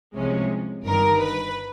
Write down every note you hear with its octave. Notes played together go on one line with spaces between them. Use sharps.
C2 C3 F3 G#3 C#4
G1 G2 D#3 A#4
B4